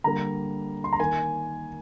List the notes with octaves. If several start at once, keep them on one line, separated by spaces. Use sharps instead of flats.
D3 G3 A#3 A#5
C6
A#5
D#3 A#3 G#5